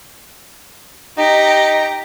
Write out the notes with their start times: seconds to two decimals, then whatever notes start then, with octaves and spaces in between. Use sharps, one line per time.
1.18 D#4 G4 A#5